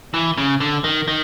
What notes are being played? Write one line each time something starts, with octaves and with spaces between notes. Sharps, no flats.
E3
C#3
D3
D#3
D#3